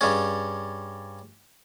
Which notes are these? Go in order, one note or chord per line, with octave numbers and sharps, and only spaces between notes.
G2 G3 C#4 G#4